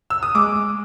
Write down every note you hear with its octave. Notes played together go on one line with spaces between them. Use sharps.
E6
D#6
G#3 D6